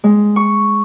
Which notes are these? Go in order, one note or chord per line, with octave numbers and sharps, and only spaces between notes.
G#3
C#6